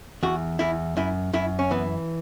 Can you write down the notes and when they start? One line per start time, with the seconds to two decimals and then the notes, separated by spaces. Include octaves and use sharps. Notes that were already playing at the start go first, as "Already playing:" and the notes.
0.23 E2 F#4
0.59 E2 E4
0.97 F#2 E4
1.33 F#2 E4
1.59 C#4
1.71 E3 B3